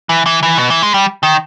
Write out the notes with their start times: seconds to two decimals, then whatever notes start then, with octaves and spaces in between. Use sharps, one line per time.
0.09 E3
0.26 E3
0.43 E3
0.58 B2
0.70 E3
0.83 G#3
0.94 G3
1.23 D#3